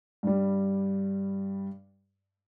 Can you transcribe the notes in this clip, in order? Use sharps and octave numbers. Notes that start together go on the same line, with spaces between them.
G2 G3